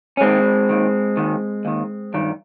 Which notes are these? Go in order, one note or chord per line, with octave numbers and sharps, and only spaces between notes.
C#4
D#2 D#3 G#3 C4
D#2 D#3
D#2 D#3
D#2 D#3
G2 D#3